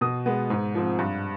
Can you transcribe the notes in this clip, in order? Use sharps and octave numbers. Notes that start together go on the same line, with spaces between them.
B2 D#6
G#3 B3
G#2
F3 C4
G2